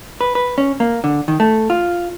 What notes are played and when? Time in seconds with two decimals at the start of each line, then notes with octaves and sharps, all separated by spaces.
0.21 B4
0.35 B4
0.58 C#4
0.80 A#3
1.04 D3
1.28 D#3
1.40 A3
1.70 F4